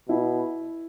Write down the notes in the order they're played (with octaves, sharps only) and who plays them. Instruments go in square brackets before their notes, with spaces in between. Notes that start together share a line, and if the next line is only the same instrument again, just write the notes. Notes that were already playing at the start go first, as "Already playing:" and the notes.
[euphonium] B2 [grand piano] E4